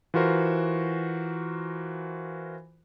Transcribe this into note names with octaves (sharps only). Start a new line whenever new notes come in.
E3 F4 F#4 A#4 C5